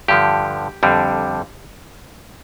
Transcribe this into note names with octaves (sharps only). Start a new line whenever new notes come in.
G2 D3 F3 G4
F2 D3 G3